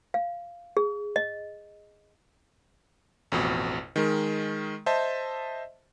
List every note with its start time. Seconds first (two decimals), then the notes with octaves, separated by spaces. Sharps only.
0.14 F5
0.77 G#4
1.16 D#5
3.32 A1 F2 B2
3.96 D#3 G#3 A#4
4.86 C5 D#5 E5 A5